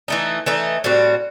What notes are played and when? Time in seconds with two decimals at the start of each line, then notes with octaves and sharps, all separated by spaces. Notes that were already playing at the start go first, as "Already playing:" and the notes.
0.08 E3 A3 D#4
0.46 E3 A3 D#4
0.84 A2 G3 C4 F#4